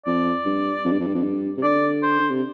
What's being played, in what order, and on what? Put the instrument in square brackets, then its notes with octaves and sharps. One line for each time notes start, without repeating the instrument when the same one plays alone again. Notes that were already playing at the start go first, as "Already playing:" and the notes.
[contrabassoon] F2 [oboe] D5
[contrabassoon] G2
F2
G2
F2
G2
F2
G2
C3
[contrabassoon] D3 [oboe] D5
[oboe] C5
[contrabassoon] D3
C3